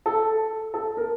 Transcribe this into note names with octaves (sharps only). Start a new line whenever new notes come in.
A4
A4
A#4